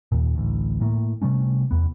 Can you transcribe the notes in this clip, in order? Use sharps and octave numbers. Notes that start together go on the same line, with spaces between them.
D#2 A#2
A1 D2
A2 A3 A#3
C3 G3 A3 C#4
E2 B3